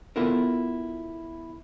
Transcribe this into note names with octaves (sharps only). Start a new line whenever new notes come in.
B3 E4 F4 A4 A#4